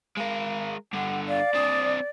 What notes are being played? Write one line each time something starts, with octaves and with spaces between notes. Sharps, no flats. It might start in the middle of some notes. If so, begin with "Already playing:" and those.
G#3 A#4 F5
G2 D3 F#5
D5 F5
C4 D4 D#6